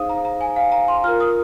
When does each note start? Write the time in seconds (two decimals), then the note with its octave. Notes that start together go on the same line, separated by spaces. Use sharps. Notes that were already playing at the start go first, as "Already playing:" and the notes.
Already playing: D#4 G#4 C5 F5 D#6
0.09 A#5
0.25 A#5
0.41 G#5
0.56 F5
0.72 A#5
0.88 C6
1.04 F4 A#4 F6
1.20 D#6